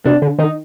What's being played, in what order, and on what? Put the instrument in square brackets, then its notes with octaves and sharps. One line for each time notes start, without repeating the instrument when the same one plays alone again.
[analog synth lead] C3 [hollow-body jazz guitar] D4
[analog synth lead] D3
[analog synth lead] D#3 [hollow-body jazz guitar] D#4